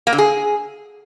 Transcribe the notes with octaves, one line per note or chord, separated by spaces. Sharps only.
A#3
D3
G#4